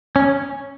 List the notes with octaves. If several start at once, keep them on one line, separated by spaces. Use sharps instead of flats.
C#4